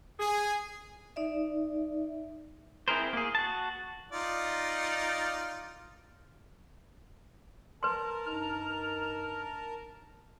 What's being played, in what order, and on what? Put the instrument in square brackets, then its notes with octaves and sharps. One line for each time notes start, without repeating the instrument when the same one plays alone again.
[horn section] G#4
[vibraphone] D#4 D5 E5
[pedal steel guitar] C4 E4 G#4 A#4 C5
A#3 G#4
F#4 A5
[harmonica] D#4 F4 D5
[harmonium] A#4 A5 A#5 [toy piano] B4 C6
[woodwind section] G2 D#4 F6